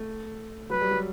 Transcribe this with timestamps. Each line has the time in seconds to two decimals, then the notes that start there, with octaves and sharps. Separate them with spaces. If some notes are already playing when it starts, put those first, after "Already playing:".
Already playing: A3
0.70 F#3 B4
0.81 G3
0.91 F#3